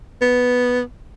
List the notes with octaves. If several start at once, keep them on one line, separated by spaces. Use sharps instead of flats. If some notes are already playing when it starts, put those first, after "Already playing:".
B3